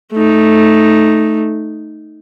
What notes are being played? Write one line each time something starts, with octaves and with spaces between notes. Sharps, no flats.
A3 D#4